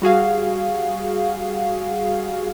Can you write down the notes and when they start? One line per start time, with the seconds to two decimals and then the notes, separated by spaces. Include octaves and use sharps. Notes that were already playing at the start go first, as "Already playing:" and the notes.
0.02 G3 F#4 G#4 F5